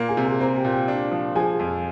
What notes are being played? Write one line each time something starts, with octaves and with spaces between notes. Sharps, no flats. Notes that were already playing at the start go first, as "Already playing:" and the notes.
Already playing: A#2 A#3
G#4 G#5
C3
G#4 G#5
C4 A#4 A#5
G4 G5
A#2
G4 G5
D4
F3
F3 G#4 G#5
F2